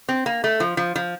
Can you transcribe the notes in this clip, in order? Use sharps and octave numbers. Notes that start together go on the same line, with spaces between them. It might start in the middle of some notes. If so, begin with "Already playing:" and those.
C4
A#3
A3
F3
F3
F3